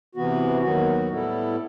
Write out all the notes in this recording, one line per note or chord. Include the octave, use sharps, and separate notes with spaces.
C3 E3 B3 F#4
D#2 D#3 F#3 B3 F#4
A2 G3 B3 E4 A4